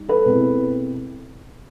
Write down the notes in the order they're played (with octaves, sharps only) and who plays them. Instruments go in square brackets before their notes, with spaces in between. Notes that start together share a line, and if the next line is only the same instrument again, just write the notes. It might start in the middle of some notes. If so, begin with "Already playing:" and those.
Already playing: [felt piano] G3 D#4
A4 B4
B2 G#3 C4 E4